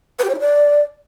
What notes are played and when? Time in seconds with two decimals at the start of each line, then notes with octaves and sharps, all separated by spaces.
0.19 B4
0.24 G4
0.29 C#5
0.34 E4
0.40 D5